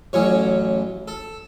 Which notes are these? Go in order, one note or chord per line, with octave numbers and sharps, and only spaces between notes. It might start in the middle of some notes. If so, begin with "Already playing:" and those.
A1 A2 F#3 C#4 C#5
A4